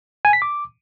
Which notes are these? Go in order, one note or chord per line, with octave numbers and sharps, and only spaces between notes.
G#5
B6
D6